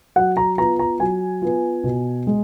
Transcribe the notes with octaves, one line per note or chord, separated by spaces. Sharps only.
F#3 F#5
A#5
B3 F4 A#5
A#5
F#3 G#5
B3 F4
B2
G#3